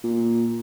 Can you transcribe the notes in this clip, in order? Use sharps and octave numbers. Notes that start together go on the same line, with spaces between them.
A#2